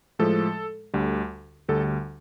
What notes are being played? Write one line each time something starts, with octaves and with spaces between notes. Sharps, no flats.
A2 F3 G#3 A4
D2 D3 G3
D2 D3 G3 A4